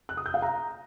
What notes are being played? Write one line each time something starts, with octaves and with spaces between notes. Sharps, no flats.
F#6
D#6
G6
F5
A#5